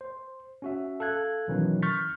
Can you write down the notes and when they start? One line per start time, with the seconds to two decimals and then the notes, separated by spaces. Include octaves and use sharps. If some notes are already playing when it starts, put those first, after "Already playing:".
0.01 C5
0.62 C#4 F#4 E5
1.00 A4 F5 F#6 G#6
1.48 B2 D#3 E3 F#3 C#4
1.82 C#6 F6 G6 A6 B6